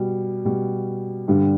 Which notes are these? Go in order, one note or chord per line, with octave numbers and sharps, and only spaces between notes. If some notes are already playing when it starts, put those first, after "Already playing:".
Already playing: B2 G3
B2 G3
G2 D3 G3